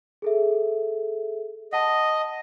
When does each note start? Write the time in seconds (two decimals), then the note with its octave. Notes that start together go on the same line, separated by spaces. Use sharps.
0.22 G#4 A4 E5
1.73 D#5 F#5 A5